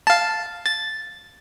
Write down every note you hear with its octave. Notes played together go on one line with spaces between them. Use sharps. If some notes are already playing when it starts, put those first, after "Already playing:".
F5 A5
A6